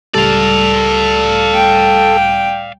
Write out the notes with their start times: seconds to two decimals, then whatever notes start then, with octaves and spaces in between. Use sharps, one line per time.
0.15 C#2 A2 G3 A4 D5 F5
1.55 G5